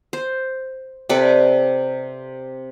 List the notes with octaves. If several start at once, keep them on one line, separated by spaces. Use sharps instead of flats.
C5
C3 A4 B4 D5